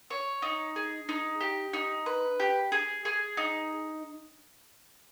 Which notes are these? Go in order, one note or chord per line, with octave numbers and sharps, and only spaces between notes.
C#5
D#4
G#4
D#4
G4
D#4
B4
G4
G#4
G#4
D#4